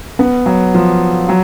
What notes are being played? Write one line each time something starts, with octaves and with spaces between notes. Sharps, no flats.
B3
F#3
F3
F#3